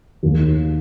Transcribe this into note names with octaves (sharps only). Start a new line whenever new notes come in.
D#2